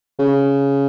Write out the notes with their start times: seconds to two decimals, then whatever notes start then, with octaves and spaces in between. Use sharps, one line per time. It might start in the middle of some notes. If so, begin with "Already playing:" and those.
0.19 C#3